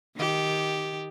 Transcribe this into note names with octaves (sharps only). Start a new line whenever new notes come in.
D#3 G4